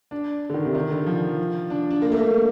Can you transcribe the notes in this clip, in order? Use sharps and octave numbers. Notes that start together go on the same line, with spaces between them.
D4
D3
D#3
C3
D#3
D3
F3
D4
D4
A#3
A3
A#3